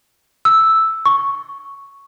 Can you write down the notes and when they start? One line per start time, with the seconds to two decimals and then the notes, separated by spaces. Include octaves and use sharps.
0.45 E6
1.06 C#6